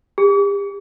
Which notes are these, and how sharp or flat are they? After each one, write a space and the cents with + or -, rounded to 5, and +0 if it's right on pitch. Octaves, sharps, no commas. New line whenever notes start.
G4 +40